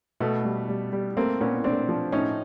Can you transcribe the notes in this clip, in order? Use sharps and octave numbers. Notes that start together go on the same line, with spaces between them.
B2 A3 B3
G3
G3
G3
A3 A#3 C4
A#2 B3 C#4
A3 C4 D4
F3
A2 C#4 D#4